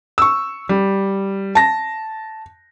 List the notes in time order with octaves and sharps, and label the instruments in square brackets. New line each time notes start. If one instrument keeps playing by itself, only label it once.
[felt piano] C#6 E6
G3
A5 A#6